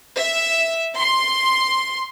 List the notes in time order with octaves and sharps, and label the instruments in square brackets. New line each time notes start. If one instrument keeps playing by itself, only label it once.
[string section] E5
C6